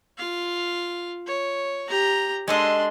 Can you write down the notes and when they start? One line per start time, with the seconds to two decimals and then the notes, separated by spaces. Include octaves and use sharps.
0.18 F4 F5
1.27 C#5
1.89 G4 A#5
2.48 G#3 D4 A4 D#5 C6